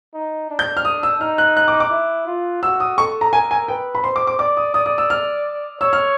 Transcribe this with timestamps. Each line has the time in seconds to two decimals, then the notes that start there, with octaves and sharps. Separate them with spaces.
0.14 D#4
0.50 D4
0.59 G6
0.77 F6
0.85 D#6
1.03 E6
1.21 D#4 F6
1.38 F#6
1.57 F#6
1.68 D6
1.80 D6
1.91 E4
2.27 F4
2.63 F#4 E6
2.80 D#6
2.98 A4 C#6
3.21 A#5
3.33 A#4 G#5
3.51 G#5
3.68 B4 G5
3.95 B5
4.03 C5 C6
4.16 D6
4.27 D6
4.39 D5 D6
4.57 D#6
4.74 D5 D#6
4.86 D#6
4.98 E6
5.10 F6
5.81 C#5 E6
5.93 F6